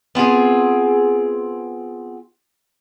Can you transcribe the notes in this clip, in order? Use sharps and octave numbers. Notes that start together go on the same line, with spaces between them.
B3 C4 F4 G#4